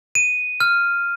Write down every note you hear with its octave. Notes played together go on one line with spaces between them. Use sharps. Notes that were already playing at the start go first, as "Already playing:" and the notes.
D#7
F6